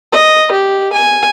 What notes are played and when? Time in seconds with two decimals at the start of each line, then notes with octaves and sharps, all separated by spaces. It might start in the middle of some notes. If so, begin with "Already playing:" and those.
0.12 D#5
0.52 G4
0.93 G#5